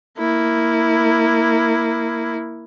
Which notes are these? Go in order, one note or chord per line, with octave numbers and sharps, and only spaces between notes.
A#3 E4